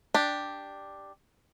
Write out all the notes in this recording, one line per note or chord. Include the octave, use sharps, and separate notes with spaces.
D4 G4